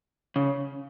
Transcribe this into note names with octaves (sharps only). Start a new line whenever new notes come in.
C#3